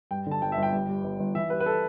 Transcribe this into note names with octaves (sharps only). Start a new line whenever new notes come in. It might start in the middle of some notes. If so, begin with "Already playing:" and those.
G2 G5
D3
A5
G1 G5
E5
G1
G5
G2
G3
G1
G1
E3 E5
G3 B4
B4
A4